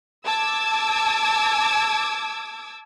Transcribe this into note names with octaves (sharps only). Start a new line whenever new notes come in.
A5 D6 E6 G#6